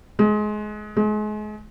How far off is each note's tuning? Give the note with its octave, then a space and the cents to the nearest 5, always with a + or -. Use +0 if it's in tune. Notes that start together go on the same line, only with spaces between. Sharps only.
G#3 +25
G#3 +35